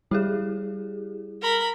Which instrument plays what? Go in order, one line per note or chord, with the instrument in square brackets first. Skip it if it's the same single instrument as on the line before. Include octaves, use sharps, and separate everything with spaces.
[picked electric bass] G3 [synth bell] E4 G4 G#4
[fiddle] A#4 B5